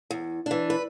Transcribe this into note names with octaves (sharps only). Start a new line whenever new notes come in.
E2
E3 D4
B4